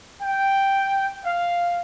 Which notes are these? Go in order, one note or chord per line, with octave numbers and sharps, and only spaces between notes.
G5
F5